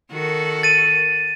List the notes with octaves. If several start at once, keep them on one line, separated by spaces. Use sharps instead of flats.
D#3 F#4 A4
A6 D#7